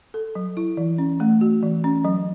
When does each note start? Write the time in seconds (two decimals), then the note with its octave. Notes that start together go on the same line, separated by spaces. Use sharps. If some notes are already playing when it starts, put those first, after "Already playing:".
0.14 A4
0.35 F#3
0.57 E4
0.77 E3
0.98 C#4
1.20 A3
1.41 F#4
1.63 E3
1.84 C#4
2.05 F#3